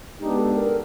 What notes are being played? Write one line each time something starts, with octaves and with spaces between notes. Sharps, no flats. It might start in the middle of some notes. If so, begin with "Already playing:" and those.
G#3 B3 D4 D#4 G4
A4
A#4